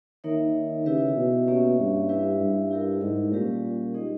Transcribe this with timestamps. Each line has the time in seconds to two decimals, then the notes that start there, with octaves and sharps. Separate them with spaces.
0.24 D#3 A#3 D#4 A#4 C#5 E5
0.86 C#3 E4 G4 B4 E5
1.16 B2
1.47 A#3 C#4 G4 C#5 E5
1.79 G2
2.09 E4 G4 B4 E5
2.40 G2
2.71 E4 G4 A#4
3.01 G#2
3.32 A#2 G3 C#4 G4 A#4
3.94 G#3 D#4 G#4 D#5